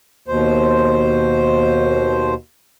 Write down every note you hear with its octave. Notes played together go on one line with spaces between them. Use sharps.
D#2 B2 C5